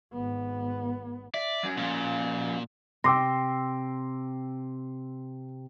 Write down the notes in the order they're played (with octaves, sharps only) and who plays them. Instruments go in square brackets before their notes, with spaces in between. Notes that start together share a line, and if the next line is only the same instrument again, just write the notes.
[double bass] G#1 B3
[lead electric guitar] D5 [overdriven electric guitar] E5
[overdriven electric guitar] F#3 C#4
[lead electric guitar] A#2 [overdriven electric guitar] F3 C#4
[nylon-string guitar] C3 [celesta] G5 A#6 [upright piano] C6 D6 E6